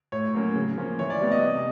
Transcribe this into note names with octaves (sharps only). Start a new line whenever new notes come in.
A2 C#5
F#3 A#3 C#4
C#3
F3 A#3 C#4
E3 C#5
D5
G3 B3
D#5
C3